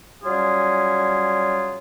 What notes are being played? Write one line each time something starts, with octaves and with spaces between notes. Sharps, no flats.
F#3 G3 C#4 F4 G#4